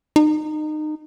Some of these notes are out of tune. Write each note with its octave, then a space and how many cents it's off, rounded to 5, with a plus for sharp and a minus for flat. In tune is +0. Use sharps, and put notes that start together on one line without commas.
D#4 -25